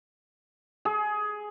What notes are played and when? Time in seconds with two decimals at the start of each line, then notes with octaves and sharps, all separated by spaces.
0.85 G#4